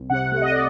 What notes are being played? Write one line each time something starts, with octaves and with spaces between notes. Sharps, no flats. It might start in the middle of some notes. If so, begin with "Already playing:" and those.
Already playing: C2
C3 F#5
A3 F#5
D#5
D5